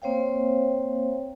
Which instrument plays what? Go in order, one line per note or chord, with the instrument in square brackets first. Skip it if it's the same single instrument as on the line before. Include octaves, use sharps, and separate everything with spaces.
[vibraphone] A#3 C4 C5 C#5 F5 G5